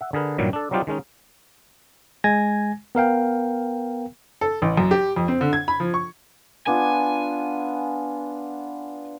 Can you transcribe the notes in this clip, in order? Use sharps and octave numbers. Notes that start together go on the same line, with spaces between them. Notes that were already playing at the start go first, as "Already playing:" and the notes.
E5 F#5
D3 G#4 A#4 B4
G2 A#2 D#3 F#3 G3
D4 A4
F#3 G3 C4 D#4 F4 G4
D#3 G#3 C#4 D#4
G#3 G#5 G#6 A#6
B3 A#4 F5 G5
A4
A1
F#2
G4
F2
C4
D3
G#6
B5
F3
C#6
B3 D4 F4 G#5